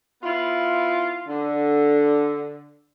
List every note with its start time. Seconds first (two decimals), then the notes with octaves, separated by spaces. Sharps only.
0.22 B3 E4 F4
1.28 D3 D4